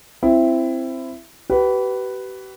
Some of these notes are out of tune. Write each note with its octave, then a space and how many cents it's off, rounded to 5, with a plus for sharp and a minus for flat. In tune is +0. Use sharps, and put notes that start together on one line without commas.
C4 +0 E4 +15
G4 -40 B4 +0